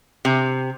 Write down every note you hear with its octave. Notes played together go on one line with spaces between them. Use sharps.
C3